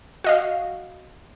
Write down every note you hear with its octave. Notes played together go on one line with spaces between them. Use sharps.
F#4 D#5 F5